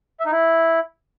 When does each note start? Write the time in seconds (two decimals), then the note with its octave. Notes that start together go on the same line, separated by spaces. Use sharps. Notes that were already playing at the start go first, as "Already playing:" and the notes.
0.20 E5
0.26 D#4
0.31 E4